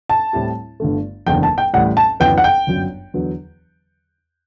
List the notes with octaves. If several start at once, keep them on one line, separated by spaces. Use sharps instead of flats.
A5
A2 G3 C4 E4 G4
G1 G2 D3 A3
F#1 E2 D3 G5
A5
G5
A1 A2 G3 F#5
A5
G1 F#2 E3 B3 G5
F#5
G5
G1 F#2 F#3
E2 D3 F#3 B3